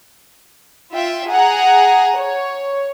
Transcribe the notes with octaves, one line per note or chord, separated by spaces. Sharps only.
F4 E5 G5
G#4 F#5 A#5
C#5